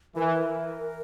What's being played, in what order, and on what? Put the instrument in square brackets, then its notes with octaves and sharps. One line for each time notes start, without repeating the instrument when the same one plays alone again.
[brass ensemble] E3 [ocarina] A#4